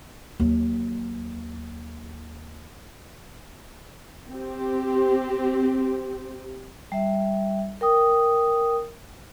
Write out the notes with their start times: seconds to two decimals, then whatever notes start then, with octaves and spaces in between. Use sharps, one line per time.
0.40 D#2 F#3
4.30 C4 G4
6.92 G3 E5
7.81 A#4 G5 D#6